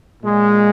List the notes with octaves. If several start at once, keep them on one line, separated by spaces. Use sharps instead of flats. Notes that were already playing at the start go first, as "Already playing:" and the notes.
A#2 G#3